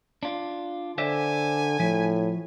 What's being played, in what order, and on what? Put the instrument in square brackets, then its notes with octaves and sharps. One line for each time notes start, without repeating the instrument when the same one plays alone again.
[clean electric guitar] D4 F4
[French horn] D3 [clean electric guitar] C5 D5 E5 [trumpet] G#5
[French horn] A2 [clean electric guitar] F3